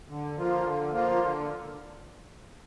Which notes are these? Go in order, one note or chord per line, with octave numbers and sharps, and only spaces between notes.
D3
F3 A#3 F4
D3
F3 A#3 F4
D3